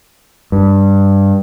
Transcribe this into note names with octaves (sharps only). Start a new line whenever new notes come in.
G2